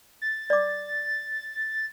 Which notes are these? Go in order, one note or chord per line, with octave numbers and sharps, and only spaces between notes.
A6
D5 D6